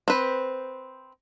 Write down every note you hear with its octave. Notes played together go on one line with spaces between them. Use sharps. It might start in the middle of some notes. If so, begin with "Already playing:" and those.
C4 B4